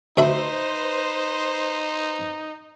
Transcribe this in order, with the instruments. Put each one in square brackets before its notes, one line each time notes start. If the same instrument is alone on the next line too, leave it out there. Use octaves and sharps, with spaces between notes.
[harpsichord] D2 E5 B5 [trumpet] D#4 [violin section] B4 C5